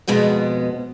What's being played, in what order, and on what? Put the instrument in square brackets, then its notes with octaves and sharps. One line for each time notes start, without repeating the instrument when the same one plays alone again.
[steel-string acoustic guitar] F2 B2 G#3 B3